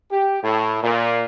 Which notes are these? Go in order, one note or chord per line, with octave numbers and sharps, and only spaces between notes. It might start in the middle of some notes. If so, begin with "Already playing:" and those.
G4
A2
A#2